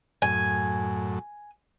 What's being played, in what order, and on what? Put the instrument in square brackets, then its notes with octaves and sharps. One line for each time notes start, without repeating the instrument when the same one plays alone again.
[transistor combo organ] F#2 A2 [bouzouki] G#5